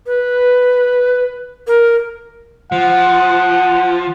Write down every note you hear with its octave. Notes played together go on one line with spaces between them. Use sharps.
B4
A#4
F3 F#5